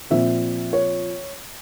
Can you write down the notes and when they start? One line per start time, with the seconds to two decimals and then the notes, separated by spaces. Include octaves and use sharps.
0.10 A#2 F3 C4 E5
0.73 C#5